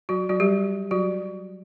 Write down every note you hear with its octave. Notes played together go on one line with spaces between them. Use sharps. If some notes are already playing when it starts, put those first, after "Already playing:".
F#3 F#4
F#3 F#4
G3 G4
F#3 F#4